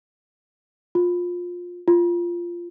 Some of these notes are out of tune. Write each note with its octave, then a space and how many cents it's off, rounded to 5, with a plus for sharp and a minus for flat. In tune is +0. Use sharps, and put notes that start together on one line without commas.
F4 +20
F4 -10